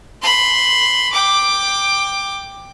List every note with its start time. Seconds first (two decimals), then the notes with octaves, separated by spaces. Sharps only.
0.22 B5 C6
1.13 G5 D6